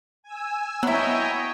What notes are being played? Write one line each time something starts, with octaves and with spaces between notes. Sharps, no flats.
G#5 E6
F#3 B3 E4 C#5 D#5 G5